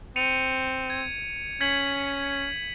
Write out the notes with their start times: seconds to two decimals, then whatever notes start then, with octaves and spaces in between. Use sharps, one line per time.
0.16 C4 C#7 D#7 F7
0.90 G#6
1.61 C#4 G#6 B6 F#7